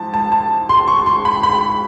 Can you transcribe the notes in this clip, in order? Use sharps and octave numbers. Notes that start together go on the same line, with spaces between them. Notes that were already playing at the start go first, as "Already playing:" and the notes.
Already playing: G#2 F3 E4 A5
A5
A5
C6
C#6
C6
B5
B5